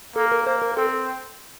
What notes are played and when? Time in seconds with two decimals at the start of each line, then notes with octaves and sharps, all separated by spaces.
0.16 A#3 A4
0.32 A#4
0.47 A#3 C5
0.62 A#4
0.76 C4 A4